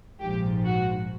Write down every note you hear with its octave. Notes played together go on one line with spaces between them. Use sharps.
A#1 G#2 F3 G4
F#4